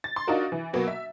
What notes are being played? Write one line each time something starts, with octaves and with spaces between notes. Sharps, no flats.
A6
C6
D4 D#4 F4 F#4 A#4
E3
B2 F#3 A#3 B3
E5